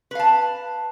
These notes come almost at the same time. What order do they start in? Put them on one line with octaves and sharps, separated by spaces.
B4 F5 A5